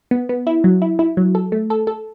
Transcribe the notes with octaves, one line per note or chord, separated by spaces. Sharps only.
B3
B3
E4
F#3
E4
E4
F#3
A4
A3
A4
A4